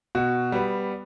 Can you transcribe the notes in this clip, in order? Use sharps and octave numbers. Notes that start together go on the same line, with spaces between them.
B2 F#4
G3 B3